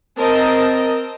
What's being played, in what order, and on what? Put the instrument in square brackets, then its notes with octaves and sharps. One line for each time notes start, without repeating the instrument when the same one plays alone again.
[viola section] C4 A#4 D#5 A5